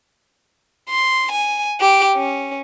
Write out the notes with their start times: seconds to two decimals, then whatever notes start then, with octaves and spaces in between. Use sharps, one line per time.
0.89 C6
1.32 G#5
1.80 G4 D7
2.16 C#4